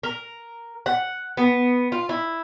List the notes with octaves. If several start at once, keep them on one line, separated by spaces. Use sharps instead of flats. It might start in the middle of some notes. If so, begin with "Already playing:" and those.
A#4
F#5
B3
F4
E4